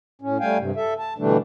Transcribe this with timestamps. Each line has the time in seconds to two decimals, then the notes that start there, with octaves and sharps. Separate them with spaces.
0.21 A2 C#4
0.40 G3 A3 F5 G5 G#5
0.58 G2 C3
0.76 A4 E5
0.99 A5
1.18 B2 D3 E3 G3 A3 D4